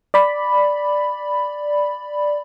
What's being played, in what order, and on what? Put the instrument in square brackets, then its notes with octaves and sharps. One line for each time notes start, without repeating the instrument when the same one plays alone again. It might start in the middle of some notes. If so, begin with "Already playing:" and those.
[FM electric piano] D5 B5